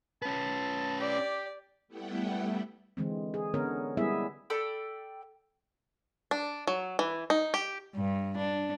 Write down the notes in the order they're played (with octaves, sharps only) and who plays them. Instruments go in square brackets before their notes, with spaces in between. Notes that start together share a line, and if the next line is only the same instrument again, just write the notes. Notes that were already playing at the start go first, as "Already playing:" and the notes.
[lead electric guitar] C#4 B4 [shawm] A5
[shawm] G4 [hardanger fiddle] D5
[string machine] G3 A3 B3 E4 F#5 G5
[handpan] D3 E3 G#3 C4
G#4
D3 B3 C#4 A#4 C#5
G3 G#3 B3 E4 G#4 E5
[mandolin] A4 D5 G5 B5
[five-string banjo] D4
F#3
E3
D#4
G4
[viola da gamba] G2
D4